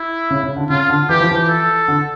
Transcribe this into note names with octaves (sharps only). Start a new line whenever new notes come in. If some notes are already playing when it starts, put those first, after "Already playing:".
Already playing: E4
C#3
C#3
D3
C#3 F4
D3
E3 G4
F3
E3
A4
D3